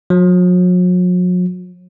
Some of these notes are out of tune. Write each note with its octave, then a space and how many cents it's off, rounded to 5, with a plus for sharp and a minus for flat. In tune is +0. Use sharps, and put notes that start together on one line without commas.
F#3 -45